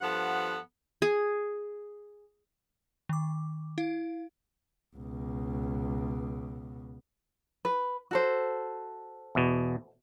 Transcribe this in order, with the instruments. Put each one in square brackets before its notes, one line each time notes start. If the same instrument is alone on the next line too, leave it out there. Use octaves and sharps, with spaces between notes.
[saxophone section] G2 F3 B3 A4 F#5
[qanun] G#4
[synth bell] D#3 D6
E4 F5
[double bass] C#2 B2
[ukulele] B4
F#4 A4 C5
[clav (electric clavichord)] E2 B2